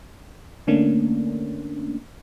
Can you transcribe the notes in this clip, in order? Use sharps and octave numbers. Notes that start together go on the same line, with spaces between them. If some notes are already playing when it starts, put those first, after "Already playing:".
D3 A3 A#3 C#4 D4